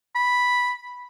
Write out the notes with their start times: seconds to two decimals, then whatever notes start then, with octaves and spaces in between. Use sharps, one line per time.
0.15 B5